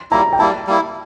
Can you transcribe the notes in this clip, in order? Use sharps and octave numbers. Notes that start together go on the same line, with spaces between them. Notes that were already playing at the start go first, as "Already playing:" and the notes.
Already playing: C6
G3 A#3 E4 A#5
G5
G3 A#3 E4 A5
G3 A#3 E4